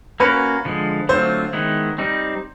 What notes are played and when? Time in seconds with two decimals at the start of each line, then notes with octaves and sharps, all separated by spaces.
0.20 A#3 C#4 F#4 A#4 B4
0.65 D3 F3 G#3
1.09 D3 F#3 A3 C4 F4 C5
1.53 D#3 G#3 B3 E4
1.98 G3 C4 D#4